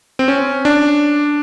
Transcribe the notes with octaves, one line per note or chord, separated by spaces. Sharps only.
C4
C#4
D4